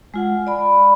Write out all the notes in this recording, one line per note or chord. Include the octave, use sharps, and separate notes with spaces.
G#3 F4 F#5
D5 B5